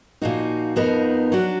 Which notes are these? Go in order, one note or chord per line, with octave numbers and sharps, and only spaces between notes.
A#2 F3 A#3 D#4 F#4
F2 F3 B3 D#4 A#4
F#3 D4 F#4